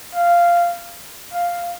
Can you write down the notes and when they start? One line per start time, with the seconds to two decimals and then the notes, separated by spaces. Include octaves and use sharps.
0.14 F5
1.33 F5